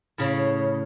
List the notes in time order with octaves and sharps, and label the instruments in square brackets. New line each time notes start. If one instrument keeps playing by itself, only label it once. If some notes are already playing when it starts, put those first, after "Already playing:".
[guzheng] A2 C#3